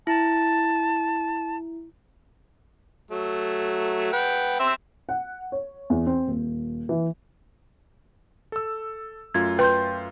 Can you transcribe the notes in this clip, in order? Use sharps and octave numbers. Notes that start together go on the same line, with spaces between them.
E4 A5
F#3 A3
B4 F#5 G5
C4 C5 E5
F#5
C#5
E2
C4
D#1
E3
A4 E6
F#2 A3 F4 G#6
B4 G5 C6 G6